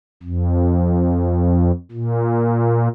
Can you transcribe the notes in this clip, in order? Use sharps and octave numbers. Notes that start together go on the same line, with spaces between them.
F2
A#2